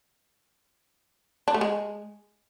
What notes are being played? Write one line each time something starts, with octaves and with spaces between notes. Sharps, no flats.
D4
A3
G#3